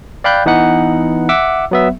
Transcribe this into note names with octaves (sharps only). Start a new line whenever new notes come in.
D5 F5 G5 B5 F#6 G6
E3 B3 D#4 F#5 F#6
E5 F#5 D6 E6
F#3 B3 E5